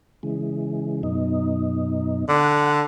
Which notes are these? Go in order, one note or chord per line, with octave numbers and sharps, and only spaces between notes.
C#3 E3 G#3
F#2 B2 D#4
D3 F#5